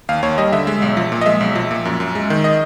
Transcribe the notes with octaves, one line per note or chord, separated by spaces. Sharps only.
D#2 F5
D#2 C#5
G3 D#5
D3 E5
G#3
B1
F3
A#2
D#5
G#3 E5
B1
F3
A#2
F#2
F#2
G#3
D#3
D#5